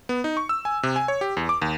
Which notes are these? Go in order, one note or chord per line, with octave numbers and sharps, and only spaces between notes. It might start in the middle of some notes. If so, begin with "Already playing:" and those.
B3
D#4
C#6
E6
G#5
C3
G#5
C#5
G4
E2
D6
D#2